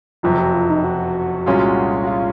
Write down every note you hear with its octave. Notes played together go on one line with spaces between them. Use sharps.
F#1 F2 C3 F#3 F4
F#4
F4
D#4
F#4
C2 A#2 G#3 C#4 F4
F#4
F4